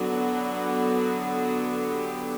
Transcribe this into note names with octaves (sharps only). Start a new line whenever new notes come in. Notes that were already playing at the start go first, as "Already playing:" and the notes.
Already playing: D3 F#3 B3 D4 F#4
G4